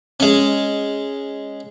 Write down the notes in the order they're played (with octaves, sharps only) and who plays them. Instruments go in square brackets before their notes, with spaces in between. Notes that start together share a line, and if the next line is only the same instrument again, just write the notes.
[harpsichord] G#3 C#4